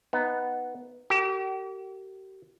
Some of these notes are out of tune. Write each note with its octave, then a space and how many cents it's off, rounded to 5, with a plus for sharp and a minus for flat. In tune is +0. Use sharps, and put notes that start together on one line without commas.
B3 +5 D#4 +0
G4 -40 A#4 -40